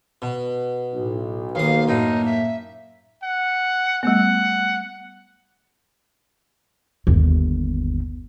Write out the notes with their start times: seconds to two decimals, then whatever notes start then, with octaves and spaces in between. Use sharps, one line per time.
0.22 B2
0.94 B1 A2
1.55 D#2 A#3 F5 D#6
1.88 F#2 A2 D#4
2.25 E5
3.23 F#5
4.03 G3 A3 B3 F#5
7.07 G1 D#2